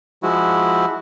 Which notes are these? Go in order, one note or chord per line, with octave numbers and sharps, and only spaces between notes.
F3 G#3 E4 F#4